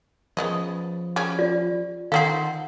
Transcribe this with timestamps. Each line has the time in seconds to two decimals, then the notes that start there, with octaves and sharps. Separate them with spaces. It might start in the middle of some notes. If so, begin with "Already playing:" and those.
0.37 C#3 F3 B3 D#5
1.16 C#3 G3 C#4
1.39 F4 D5
2.12 D#3 C4 D#4 A4 F5 F#5